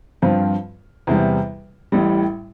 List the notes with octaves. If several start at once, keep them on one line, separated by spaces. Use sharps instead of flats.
G2 F3 C4 F4
E2 C3 E3 G3
A1 A2 G3